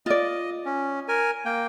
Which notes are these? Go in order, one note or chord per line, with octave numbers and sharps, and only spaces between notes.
F4 D5 D#5
C#4
A#4 G#5
A#3 G5